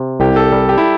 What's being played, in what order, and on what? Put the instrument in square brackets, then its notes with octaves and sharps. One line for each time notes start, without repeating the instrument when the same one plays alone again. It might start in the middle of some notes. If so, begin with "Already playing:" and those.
Already playing: [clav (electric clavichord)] C3
[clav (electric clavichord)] C2 [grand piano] G4
[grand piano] A4
[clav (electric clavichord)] G3
[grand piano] G4
E4